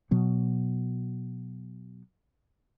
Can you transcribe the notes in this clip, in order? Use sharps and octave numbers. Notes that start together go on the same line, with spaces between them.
B2 F#3 B3